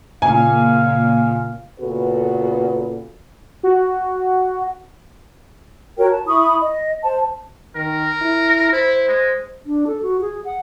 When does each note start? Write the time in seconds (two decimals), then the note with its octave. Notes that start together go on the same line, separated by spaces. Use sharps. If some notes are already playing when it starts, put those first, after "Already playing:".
0.22 A#2 C#3 F5 G#5
1.80 A#2 C#3 B3 F#4 A4 B4
3.63 F#4
5.98 F#4 A#4 C#5 G5
6.10 A5
6.27 E4 B5 C#6 D#6
6.61 D#5
7.03 C5 A5
7.76 D#3 A#4
8.22 E4
8.73 E4 C5
9.08 G#3
9.66 D4
9.87 A4
10.02 F#4
10.21 G#4
10.45 F#5